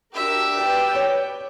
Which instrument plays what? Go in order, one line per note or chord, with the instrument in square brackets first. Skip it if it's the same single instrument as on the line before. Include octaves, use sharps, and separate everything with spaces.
[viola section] D4 F#4 A#4 [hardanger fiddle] G4 E5
[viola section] B4 D5 G5
[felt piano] C#5